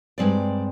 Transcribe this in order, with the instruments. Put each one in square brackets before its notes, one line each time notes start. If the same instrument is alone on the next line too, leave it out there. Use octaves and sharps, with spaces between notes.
[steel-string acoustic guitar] G2 D3 G#3 C4 D5